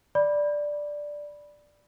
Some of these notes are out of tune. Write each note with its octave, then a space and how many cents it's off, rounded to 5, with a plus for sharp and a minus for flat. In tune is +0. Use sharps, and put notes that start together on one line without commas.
D5 +0 B5 -10